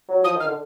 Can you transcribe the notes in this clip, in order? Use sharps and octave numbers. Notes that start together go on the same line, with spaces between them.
F#3
F3 D#6
D#3 F6
D3